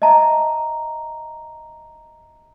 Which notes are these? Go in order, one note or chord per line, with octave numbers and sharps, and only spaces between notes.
D#5 E5 A5 A#5